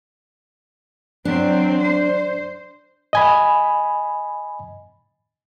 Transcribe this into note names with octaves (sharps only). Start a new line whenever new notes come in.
F#3 C4 D4
C5
D#5 G#5 B5